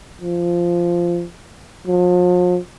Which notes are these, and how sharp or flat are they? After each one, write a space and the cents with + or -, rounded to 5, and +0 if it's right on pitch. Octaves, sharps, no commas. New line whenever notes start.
F3 -10
F3 +40